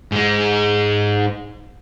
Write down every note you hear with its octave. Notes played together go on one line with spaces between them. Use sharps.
G#2 G#3